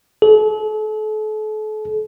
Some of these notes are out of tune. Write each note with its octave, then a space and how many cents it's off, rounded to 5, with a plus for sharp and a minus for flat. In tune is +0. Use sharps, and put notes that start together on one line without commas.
A4 -40